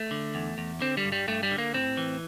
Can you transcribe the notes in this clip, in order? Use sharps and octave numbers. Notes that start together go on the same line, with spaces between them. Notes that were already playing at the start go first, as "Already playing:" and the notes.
Already playing: A3
D3
E2
E2
D3 C4
G3
G2
G3
G2 A3
G3
D3
A#3
A2 C4
E3